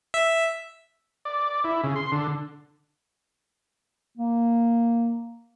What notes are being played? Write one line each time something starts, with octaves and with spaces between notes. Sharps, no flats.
E5
D5
E4
C#3
C6
D3
A#3